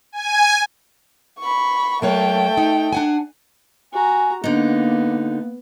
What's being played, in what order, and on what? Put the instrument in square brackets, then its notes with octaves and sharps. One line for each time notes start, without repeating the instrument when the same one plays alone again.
[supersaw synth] G#5
[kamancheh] B5 C#6
[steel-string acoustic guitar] F#3 A#3 C#5 [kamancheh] A3 G5
[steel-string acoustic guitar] D#4
D4 F#5 G#5
[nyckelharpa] F#4 A#5 [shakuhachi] G#5
[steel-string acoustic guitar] D3 D#4 [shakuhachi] A#3 [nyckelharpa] B3